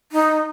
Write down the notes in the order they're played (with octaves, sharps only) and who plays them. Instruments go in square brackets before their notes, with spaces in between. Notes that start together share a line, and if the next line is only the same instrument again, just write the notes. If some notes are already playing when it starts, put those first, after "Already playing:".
[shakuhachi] D#4